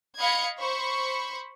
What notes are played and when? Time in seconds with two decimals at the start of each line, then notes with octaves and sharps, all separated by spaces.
0.18 D#5 F5 B5 G#6 C#7
0.58 C5 B5 C#6